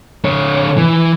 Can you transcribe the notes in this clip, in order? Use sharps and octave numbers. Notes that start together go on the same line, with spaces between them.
D3 C#5
E3